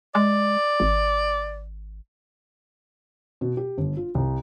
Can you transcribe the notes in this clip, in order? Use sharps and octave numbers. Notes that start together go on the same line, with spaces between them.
G#3 D5
G#1
B2
G4
G1
F4
C2